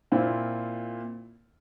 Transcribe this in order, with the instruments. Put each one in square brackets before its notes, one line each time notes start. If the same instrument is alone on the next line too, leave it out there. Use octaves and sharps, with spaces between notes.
[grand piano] A#2 C4 E4 F4